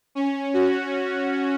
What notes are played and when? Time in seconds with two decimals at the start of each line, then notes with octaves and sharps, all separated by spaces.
0.15 C#4
0.54 F#4